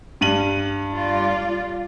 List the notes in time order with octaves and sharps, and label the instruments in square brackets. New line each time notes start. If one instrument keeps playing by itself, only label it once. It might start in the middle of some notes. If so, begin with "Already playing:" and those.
[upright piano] G2 D#7 F#7
[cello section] G3 F4 D5